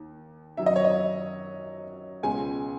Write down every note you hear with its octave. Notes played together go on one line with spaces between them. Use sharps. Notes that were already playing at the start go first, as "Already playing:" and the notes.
Already playing: D#2
F#2 D#3 F#3 E5
D#5
C#5
D#5
C#2 B2 G#3 C#4 G#5